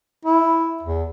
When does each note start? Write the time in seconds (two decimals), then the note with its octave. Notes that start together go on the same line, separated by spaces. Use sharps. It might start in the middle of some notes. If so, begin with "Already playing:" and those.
0.25 E4
0.83 E2